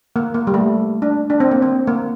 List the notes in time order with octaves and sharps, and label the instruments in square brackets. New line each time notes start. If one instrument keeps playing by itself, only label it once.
[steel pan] A#3
A#3
G3
A3
D4
D4
C4
A#3
C4
A#3